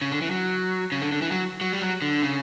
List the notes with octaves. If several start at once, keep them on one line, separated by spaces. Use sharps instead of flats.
C#3
D3
E3
F#3
C#3
D3
D3
E3
F#3
F#3
G3
F#3
D3
C#3